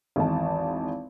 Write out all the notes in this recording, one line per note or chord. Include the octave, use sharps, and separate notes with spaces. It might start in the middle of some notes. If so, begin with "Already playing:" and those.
G#1 E2 A5